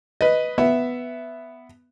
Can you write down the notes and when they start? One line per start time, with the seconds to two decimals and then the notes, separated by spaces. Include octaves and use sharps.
0.21 B4 D#5
0.58 B3 E5